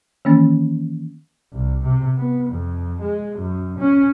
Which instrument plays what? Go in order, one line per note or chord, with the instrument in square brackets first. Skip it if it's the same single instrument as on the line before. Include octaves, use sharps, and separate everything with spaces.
[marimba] D#3 E3 A#3 C#4 A6
[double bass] C2
C3
B3
F2
G#3
F#2
C#4